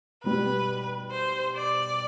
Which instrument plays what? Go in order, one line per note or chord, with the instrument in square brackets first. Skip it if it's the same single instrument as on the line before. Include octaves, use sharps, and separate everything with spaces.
[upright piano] B2 G3 B3 [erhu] B4
[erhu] C5
D5